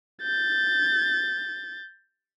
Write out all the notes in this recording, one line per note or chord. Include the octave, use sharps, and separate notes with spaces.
G6 A6